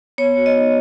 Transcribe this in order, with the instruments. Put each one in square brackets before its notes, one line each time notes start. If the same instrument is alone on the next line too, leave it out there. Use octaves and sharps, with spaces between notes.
[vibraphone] B3 C#5
F#4
D#5
D#4